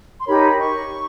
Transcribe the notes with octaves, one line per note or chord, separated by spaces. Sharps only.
C6
D#4 G4 A#4 C#5 B5
C#6